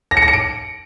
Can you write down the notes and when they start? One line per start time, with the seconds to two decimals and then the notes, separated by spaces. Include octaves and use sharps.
0.11 A#6
0.17 C#7
0.22 A#6
0.28 C#7
0.33 D7